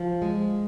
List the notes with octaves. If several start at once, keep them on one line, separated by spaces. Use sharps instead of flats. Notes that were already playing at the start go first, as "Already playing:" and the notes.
Already playing: F3
G#3